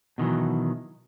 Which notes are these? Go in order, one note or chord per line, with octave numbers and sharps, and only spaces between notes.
B2 D#3 E3 F#3